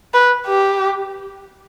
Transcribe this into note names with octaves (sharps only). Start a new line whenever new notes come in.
B4
G4